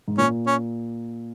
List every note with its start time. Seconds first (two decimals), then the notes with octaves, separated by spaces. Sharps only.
0.08 G#2
0.18 A#2 C#4
0.47 C#4